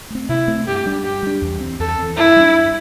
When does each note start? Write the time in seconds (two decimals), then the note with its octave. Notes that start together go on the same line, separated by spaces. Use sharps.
0.10 A3 C4
0.29 C3 E4
0.48 A3 C4
0.67 G2 G4
0.86 G3 D4
1.04 G2 G4
1.23 G3 D4
1.41 E2
1.60 E3 C4
1.79 E2 A4
1.98 E3 C4
2.17 G2 E4
2.36 G3 D4
2.55 G2